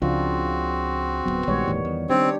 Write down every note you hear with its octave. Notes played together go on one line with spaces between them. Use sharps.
C#2 C#3 F3 C4 D4 F4 F#4
D1 C#2 F#3 B3
A#1 D#3 G3 G#3 C#5
D#1 A2 E3
E2
D#3 G3 C4 D4 G4 C#5